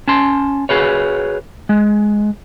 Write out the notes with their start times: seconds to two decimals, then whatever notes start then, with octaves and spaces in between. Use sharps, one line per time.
0.08 C#4 A5 C6
0.69 F#4 G#4 B4 C#5
1.69 G#3